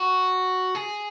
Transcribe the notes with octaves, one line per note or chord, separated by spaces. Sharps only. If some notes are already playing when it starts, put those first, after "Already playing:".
Already playing: F#4
G#4